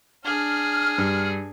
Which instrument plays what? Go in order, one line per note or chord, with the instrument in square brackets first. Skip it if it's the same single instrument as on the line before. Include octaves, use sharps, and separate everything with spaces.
[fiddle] D4 G#4 [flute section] F6
[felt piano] G2